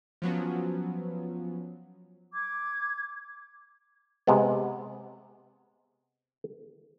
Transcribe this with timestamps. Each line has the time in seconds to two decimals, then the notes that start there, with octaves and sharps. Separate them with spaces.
0.22 F3 F#3 B3 C#4
2.33 D6 G#6
4.27 C3 G#3 B3